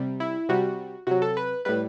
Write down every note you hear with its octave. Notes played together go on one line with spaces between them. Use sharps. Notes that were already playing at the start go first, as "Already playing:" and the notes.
Already playing: C3 G3
E4
C3 G3 F#4
C3 F#3 F#4
A4
B4
A2 G3 B4